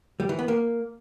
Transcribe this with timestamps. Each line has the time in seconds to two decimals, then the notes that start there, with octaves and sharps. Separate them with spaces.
0.20 G3
0.29 E3
0.39 B3
0.48 A#3